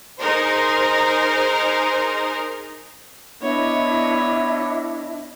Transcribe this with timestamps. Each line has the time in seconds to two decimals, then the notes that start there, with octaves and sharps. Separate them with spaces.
0.19 D#4 G#4 A#4 C5
3.41 B3 D4 E4 C#5 D#5